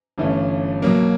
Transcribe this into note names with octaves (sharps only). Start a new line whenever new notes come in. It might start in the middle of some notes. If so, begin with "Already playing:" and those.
G1 G2 E3 A3 C#4
B2 F#3 A#3